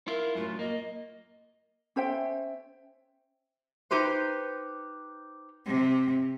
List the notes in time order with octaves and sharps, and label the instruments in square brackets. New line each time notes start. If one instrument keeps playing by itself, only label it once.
[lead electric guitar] E4 F4 [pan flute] A#4
[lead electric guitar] F#2 A2 [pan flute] F4
[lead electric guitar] A#3 [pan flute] D#5
[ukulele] C#4 C5 E5 G5
[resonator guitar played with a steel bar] D#4 G4 B4 C5
[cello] C3